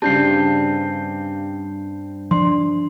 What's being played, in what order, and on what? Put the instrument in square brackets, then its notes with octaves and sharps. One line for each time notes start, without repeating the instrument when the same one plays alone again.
[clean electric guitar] G2 C4 [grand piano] C#3 D4 G4 [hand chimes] A5 G6 C7
[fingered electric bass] F3 [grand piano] D4 [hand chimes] C6